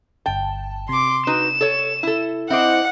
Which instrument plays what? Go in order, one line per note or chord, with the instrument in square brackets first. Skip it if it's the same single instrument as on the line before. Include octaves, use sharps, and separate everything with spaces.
[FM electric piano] G1 A5 [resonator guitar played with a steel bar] G5
[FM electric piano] C3 [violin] C6 D6
[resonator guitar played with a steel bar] D#4 F#4 B4 [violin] E7
[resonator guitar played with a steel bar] A4 C#5
E4 A4
[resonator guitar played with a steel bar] C4 C5 [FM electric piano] E4 D#5 D6 [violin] F#5